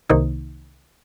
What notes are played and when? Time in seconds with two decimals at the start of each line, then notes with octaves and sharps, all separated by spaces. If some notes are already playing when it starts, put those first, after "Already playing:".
0.10 C2 C3 D#3 A#3 D#4